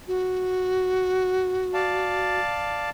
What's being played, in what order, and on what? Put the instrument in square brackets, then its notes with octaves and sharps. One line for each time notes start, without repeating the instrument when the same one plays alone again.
[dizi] F#4
[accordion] D5 F5 A5